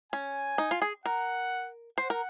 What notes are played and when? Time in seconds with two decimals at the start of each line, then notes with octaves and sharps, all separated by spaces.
0.12 C#4 G#5
0.58 D#4
0.71 F4
0.82 G#4
1.06 A#4 F#5
1.98 C5 F#5
2.10 A#4